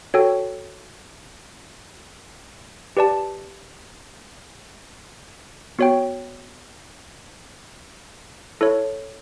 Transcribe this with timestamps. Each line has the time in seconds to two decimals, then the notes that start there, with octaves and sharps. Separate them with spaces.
0.14 F#4 A4 C#5 G5
2.97 G4 B4 D5 A5
5.79 B3 F#4 C#5 G5
8.61 E4 A4 C#5